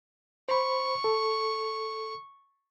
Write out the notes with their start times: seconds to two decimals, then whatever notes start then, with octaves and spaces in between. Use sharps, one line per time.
0.49 C5 B5 C#6
1.04 A4